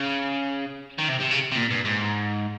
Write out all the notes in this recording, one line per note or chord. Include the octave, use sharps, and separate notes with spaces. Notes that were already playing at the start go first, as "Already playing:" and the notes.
Already playing: C#3
D#3
C3
C3
C#3
C3
A#2
G2
G#2